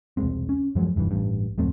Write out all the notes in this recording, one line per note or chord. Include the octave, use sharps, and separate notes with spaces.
E1 C2 G#3 C4
C#4
F#2 F3 F#3 G#3
F1 G2 C#3 E3
A1 G2
D1 F2 A3 C4